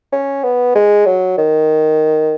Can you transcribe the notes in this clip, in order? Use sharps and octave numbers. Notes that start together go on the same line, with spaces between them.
C#4
B3
G#3
F#3
D#3